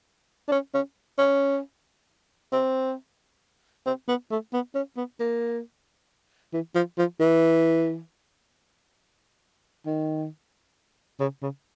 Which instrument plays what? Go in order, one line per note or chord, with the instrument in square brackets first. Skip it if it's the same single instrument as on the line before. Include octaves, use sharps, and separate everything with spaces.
[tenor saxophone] D4
C#4
C#4
C#4
C4
C4
B3
A3
B3
C#4
B3
A#3
E3
F3
F3
E3
D#3
C#3
C#3